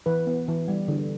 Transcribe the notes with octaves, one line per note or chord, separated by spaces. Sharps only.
E3 B4
B3
E3
G3
D3